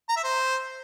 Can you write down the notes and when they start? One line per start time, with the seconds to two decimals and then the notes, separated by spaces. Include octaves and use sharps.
0.09 A#5
0.17 E5
0.24 C5